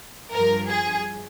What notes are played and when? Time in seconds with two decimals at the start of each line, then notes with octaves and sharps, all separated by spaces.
0.31 G2 F3 A#4
0.69 G#4